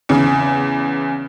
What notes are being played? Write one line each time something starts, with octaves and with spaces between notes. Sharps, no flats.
E2 C#3